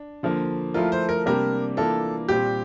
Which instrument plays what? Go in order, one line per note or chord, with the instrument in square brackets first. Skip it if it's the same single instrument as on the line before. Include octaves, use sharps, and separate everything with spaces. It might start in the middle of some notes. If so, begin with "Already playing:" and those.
Already playing: [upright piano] D4
[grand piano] D3 F3 A#3
[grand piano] F3 A3 E4 A#4 [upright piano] F4
[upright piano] C5
A#4
[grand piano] C3 G3 A#3 D4 G4 [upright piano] A#4
[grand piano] E3 A#3 D4 F4 [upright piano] A4
[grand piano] A#2 G3 C4 [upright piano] G4